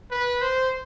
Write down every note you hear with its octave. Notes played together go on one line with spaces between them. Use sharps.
B4
C5